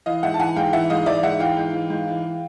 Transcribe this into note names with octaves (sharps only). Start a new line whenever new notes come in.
E3 D#5 F5
G#2 E5 F#5
A5
E3 F#5 G#5
G#2 F5 G5
E3 E5 F#5
G#2 D#5 F5
E3 D5 E5
G#2 E5 F#5
E3 F5 G5
G#2
E3
G#2
E3